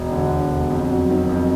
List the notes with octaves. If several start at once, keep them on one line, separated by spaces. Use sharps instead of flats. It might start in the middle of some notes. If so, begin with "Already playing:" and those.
Already playing: E1
D3
E1
E1
F2
F#3
D#3
F2